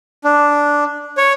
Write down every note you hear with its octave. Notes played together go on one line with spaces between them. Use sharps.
D4
C#5